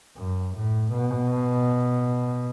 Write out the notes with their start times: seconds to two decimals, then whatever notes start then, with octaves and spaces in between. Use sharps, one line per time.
0.17 F#2
0.55 A2
0.93 B2